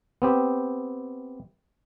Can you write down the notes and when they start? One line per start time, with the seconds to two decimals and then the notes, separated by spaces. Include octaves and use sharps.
0.22 B3 C4 G4